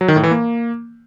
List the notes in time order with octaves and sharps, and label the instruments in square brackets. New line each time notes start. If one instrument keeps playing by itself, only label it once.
[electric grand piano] F#3
D#3
A2
E3
A#3